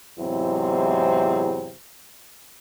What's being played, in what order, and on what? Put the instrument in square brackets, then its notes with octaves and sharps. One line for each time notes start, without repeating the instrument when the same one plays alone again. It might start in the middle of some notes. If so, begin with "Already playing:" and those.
[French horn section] E2 G#2 C3 F#3 C4 E4